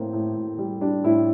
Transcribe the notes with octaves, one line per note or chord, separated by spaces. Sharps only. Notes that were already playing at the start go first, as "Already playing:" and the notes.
Already playing: A2 A#3 C4
A2
A2
G3
G3 D4
A2 E4